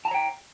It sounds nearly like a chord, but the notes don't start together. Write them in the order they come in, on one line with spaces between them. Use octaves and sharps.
A5 A#5 C#5 G5